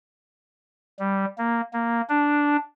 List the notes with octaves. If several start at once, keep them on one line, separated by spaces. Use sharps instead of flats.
G3
A#3
A#3
D4